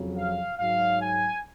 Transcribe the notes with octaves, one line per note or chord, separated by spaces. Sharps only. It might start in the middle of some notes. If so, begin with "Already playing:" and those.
Already playing: F2 C#3 F#3
F5
G#2 F#3 F5
G#5